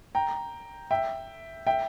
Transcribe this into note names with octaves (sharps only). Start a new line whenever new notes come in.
G5 A#5
E5 G5
E5 G5